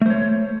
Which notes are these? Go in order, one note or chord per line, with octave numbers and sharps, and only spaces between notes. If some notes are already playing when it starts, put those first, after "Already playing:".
A3 C5 C#5